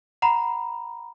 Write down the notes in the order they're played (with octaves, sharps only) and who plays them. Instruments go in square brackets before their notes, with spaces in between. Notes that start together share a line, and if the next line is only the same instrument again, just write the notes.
[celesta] F#5 A#5 B5